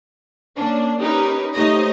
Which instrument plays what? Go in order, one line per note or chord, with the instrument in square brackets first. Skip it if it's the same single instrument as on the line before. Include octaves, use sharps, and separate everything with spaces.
[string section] A#3 C#4 D4
C#4 D#4 G4 A#4 B4
A3 D#4 G4 C5 C#5 D#5